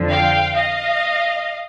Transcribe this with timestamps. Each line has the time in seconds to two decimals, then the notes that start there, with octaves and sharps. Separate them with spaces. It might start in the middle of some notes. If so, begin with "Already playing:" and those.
Already playing: F2 D3 F3
0.10 F5 G5
0.55 D#5 F5